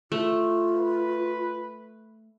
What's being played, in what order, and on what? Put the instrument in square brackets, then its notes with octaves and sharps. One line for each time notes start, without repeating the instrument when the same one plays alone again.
[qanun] A3 [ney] F4
[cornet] B4